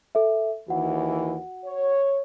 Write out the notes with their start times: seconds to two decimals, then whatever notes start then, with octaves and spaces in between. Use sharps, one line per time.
0.15 A4 E5
0.68 D#2 E3 F#4 F#5
1.65 C#5